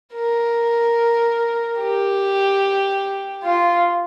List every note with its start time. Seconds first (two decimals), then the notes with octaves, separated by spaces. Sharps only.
0.14 A#4
1.79 G4
3.43 F4